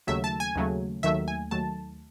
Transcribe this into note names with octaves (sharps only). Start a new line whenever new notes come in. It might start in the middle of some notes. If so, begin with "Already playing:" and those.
D#2 C#3 F#3 A3 E5
A5
G#5
D#2 C#3 F#3 A3
D#2 D#3 F#3 A3 E5
G#5
D#2 D#3 F#3 A3 A5